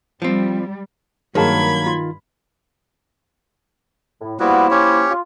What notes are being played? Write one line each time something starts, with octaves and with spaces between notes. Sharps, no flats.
F3 G3 C4
G2 D#3 F#3 A#3 G#4 A5 B5 G#6
F4
A2
F3 G3 A#3 B3 E4 F#4
C#4 G4 C#5
F4